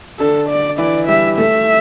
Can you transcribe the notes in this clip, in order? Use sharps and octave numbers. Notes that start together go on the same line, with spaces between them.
D3 D4 A4
D5
E3 E4 D5
G3 G4 E5
A3 A4 E5